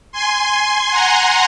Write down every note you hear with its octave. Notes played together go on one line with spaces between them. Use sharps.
G#5 C6
F#5 A#5